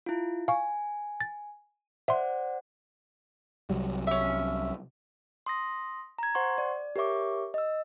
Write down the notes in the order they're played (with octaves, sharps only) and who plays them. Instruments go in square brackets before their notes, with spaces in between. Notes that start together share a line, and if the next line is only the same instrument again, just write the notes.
[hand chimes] E4 F4
[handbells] F5 C#6 [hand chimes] G#5
[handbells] A6
[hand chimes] C5 D5 F#5 [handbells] E5 C6
[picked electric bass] C2 F#3 G3
[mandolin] C#4 E5
[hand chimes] C6 D#6 A#6
A#5 G#6
C5 F#5 C6 C#6
D5
G4 A#4 C#5 E5 C#6 D6
D#5 E6